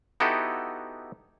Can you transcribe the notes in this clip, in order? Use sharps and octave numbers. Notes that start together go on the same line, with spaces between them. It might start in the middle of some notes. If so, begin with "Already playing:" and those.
B3 D#4 E4 F#4 G4 A4